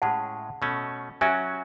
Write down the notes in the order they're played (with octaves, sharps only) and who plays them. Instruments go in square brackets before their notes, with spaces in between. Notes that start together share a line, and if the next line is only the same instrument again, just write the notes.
[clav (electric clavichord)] A2 G#3 C#4 [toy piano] F#5 A5
[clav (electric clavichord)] B2 A3 C#4
[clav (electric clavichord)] F#3 C#4 F#4 [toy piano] E5 G#5